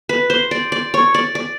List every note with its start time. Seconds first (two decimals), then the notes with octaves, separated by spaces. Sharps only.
0.09 B4
0.30 C5
0.51 D5
0.72 D5
0.94 C#5
1.15 D5
1.35 D5